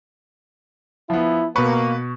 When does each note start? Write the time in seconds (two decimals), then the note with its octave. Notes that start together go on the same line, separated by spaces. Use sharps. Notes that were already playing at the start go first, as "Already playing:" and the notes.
1.10 F3 B3 E4
1.56 B2 A#3 B4 C#6